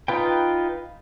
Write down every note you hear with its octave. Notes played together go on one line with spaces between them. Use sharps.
D#4 F4 B4 G5